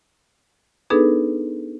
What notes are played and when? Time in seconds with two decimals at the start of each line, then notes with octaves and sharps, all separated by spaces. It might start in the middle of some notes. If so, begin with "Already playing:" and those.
0.90 B3 D4 D#4 G#4 A4 B4